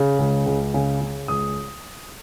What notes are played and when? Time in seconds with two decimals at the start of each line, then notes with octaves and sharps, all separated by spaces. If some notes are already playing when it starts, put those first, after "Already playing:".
Already playing: C#3
0.19 C#2
0.46 C#2
0.74 C#3 G#5
1.01 C#3
1.28 C#2 D#6